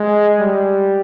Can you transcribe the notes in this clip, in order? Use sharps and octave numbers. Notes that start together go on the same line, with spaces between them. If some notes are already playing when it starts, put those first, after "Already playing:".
Already playing: G#3
G3